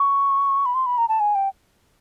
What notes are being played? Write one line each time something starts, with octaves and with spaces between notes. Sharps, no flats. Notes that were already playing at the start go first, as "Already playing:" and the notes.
Already playing: C#6
B5
C6
B5
A#5
A5
G#5
G5